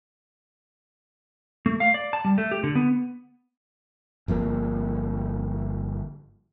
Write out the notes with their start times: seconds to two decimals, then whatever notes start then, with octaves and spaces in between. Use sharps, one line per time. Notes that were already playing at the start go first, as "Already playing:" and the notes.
1.66 A3
1.80 F5
1.94 D5
2.13 A5
2.25 G3
2.38 A3
2.51 G4
2.63 D3
2.75 B3
4.28 G1 F3 A#3